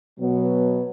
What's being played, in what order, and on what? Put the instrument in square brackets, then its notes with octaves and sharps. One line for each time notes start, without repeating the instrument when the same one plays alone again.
[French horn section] B2 F#3 B3